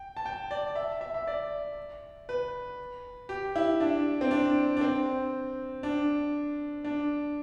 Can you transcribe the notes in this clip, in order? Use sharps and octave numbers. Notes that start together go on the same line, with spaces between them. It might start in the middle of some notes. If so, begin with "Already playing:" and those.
Already playing: G5
A5
G5
D5
E5
E5
E5
D5
B4
G4
E4
D4
C4
D4
D4
C4
D4
D4